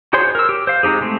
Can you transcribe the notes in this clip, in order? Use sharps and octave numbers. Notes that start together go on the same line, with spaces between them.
F#4 G#4 C5 C#5 C6
A#4 E6
G4
C5 F5
G#3 C4 D#4 G4 G#4
G#3 A3 C4